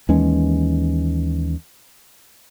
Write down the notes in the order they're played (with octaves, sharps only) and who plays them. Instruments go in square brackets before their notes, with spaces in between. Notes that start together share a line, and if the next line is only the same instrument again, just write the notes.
[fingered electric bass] D#2 E3 G#3 C#4